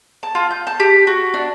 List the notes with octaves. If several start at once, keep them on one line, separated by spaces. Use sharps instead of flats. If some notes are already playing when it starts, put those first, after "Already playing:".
A5
F4
G6
A5
G4
F#4
D4